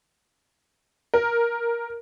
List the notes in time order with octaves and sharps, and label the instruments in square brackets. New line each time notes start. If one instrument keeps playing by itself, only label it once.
[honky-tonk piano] A#4